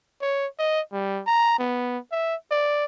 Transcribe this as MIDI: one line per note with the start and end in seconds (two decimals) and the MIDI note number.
0.22 0.46 73
0.59 0.80 75
0.92 1.21 55
1.27 1.59 82
1.59 1.98 59
2.11 2.35 76
2.51 2.85 74